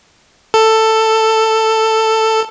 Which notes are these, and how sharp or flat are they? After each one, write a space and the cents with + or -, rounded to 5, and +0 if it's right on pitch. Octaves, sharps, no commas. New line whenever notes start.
A4 +10